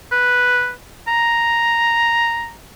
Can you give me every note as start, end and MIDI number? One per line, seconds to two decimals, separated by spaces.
0.12 0.72 71
1.08 2.52 82